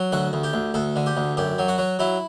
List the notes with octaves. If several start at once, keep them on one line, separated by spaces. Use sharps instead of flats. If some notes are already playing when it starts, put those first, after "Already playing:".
Already playing: F#3
D2 F#4
D2
G4
D2
D2 A4
D3
G4
D2
F#2 G4
F#3
F#4
F#3
F#3 E4